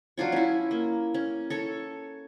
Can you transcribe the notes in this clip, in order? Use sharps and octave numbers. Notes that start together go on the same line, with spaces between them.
F#3 D4 F4 C#5
C#4 E4
A#3
C#4
A4 C#5